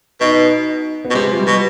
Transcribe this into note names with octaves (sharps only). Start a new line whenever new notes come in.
B2 D#4
B3
B2
C3 G#3
F3
G3
B2